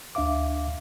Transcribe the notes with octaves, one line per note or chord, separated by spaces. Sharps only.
D2 D4 E5 F5 D6